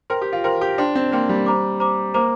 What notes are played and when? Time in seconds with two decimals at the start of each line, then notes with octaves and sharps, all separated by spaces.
0.10 A#4 C5 G5 C6
0.22 G4
0.33 F4
0.44 A#4 C5 G5 C6
0.61 G4
0.78 D4 C5 G5 C6
0.95 C4
1.12 A#3 C5 G5 C6
1.29 G3
1.46 C5 A#5 D6
1.80 C5 A#5 D6
2.14 A#3 C5 A#5 D6